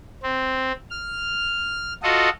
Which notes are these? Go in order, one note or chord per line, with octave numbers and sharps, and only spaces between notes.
C4
F6
F4 F#4 A4 D#5